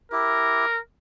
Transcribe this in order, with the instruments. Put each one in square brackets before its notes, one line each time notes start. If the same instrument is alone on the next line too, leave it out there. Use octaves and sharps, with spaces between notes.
[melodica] E4 G4 [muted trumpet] A#4